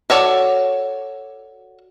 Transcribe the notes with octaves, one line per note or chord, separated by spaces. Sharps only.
F#4 A4 C#5 D5